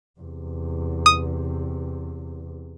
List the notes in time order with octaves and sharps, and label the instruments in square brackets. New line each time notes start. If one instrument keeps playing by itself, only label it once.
[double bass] E2 C3
[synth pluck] D#6